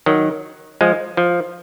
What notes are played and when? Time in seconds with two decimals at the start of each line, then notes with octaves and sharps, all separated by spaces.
0.06 D#3 F#3
0.81 F3 G#3
1.17 F3